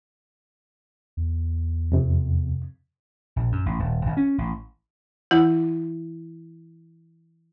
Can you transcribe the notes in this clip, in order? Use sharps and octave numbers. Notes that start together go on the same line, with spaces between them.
E2
F2 C3
A#1
F#2
A1
D#1
G#1
C#4
A1
E3 E4 F#5